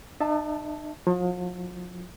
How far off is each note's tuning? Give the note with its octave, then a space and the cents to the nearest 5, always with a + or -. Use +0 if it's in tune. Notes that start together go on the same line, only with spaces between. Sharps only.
D#4 -45 E5 -10 A5 +0
F3 +45 E4 +30